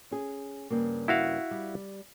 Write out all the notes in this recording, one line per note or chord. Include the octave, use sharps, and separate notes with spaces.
C#4 G#4
G2 C#3 A#3
E4 F#4 F5
G3